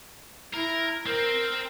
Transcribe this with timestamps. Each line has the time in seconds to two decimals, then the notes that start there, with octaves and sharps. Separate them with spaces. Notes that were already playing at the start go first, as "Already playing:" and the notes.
0.54 E4 A#4
1.06 C4 A#4